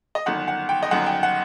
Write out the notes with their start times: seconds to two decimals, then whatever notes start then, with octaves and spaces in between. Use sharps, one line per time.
0.15 D#5
0.26 G1 F#2 D#3 F#5
0.48 F#5
0.69 G5
0.83 D#5
0.91 G1 F#2 D#3 F#5
1.06 G5
1.23 F#5